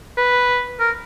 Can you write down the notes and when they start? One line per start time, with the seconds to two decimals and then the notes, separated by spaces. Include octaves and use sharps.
0.18 B4
0.80 A#4